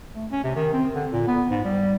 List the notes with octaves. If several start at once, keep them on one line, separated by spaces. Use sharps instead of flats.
A3
C#4
C3
D#3
C4
D3
A#2
B3
G#2
G3